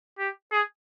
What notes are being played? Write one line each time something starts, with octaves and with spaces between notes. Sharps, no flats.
G4
G#4